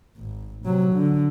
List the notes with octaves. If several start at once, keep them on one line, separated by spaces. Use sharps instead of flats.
G#1
C3 F#3
D3